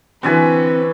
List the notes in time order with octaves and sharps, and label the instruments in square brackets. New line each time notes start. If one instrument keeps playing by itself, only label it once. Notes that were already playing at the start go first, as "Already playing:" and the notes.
[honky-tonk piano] D3 E3 [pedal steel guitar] C4 [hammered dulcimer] F#4 E5 G#5 [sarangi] B4